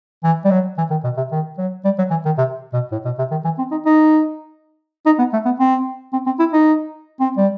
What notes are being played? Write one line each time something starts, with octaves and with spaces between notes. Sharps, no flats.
E3
G3
F#3
E3
D#3
B2
C3
D#3
F#3
G3
F#3
E3
D#3
C3
B2
A2
B2
C3
D#3
E3
C4
D#4
D#4
D#4
B3
A3
B3
C4
C4
C4
E4
D#4
C4
G3